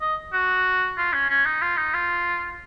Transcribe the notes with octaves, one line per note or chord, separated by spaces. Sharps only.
D#5
F#4
F4
C#4
C#4
D#4
F4
D#4
F4